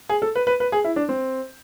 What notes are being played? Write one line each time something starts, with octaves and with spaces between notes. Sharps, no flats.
G#4
A4
B4
B4
B4
G#4
E4
D4
C4